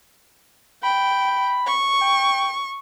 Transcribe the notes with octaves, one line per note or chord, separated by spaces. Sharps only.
G5 B5
C#6
G5